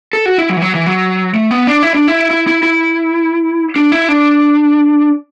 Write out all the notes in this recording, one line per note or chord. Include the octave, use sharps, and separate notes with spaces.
A4
F#4
E4
F#3
E3
F#3
E3
F#3
A3
B3
D4
E4
D4
E4
E4
E4
E4
D4
E4
D4